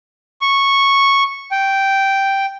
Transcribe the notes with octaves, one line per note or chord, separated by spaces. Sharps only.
C#6
G5